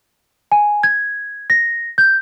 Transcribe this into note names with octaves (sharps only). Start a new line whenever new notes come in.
G#5
G#6
A#6
G6